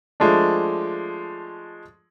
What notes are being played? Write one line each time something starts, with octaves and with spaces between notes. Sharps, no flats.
F3 G#3 A3 D4